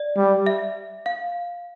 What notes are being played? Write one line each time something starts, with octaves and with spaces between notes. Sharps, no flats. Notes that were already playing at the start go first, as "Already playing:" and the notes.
Already playing: D5
G3
E5
F5